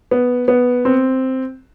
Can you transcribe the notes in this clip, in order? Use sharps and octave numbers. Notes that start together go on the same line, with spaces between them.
B3
B3
C4